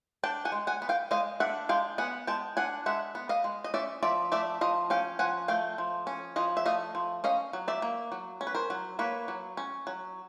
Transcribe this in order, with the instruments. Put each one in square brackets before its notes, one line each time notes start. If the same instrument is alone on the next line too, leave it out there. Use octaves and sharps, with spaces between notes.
[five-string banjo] D4 G5 A5
F#5 G#5
G#3
F#5 G#5
B3
F5 G5
G#3 D#5 F5
D4 E5 F#5
G#3 F5 G5
B3 F#5 G#5
G#3 G5 A5
D4 F#5 G#5
G#3 E5 F#5
B3
D#5 F5
G#3
D#5
C#4 D5 E5
F3 D5 E5
A3 D5 E5
F3 D#5 F5
C#4 F5 G5
F3 F#5 G#5
A3 F5 G5
F3
C#4
F3 D#5 F5
E5
A3 D#5 F5
F3
C#4 D#5 F5
F#3
D5 E5
A#3
F#3
C#4
B4
A#4 C5
F#3
A#3 B4 C#5
F#3
C#4
F#3